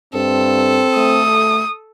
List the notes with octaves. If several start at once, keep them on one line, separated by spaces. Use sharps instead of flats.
G2 C4 A4
A3 D#6